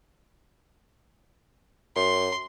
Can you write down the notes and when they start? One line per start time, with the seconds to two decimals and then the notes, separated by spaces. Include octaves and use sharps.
1.96 F#2 C6